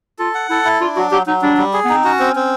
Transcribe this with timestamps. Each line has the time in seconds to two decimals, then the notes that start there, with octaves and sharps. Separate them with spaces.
0.19 F4 A4
0.34 F#5
0.50 E4 A4
0.65 E4
0.81 D4 F4
0.96 F#3 F#4
1.12 F#3 G4
1.27 F#3 D#4
1.42 G3 D4
1.57 G3
1.73 G#4
1.85 B3
1.90 C4 D#4
2.04 C#4 F#4
2.19 C4
2.36 C4